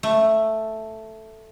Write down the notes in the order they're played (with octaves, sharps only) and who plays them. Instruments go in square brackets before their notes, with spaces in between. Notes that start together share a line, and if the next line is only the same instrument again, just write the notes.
[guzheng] A3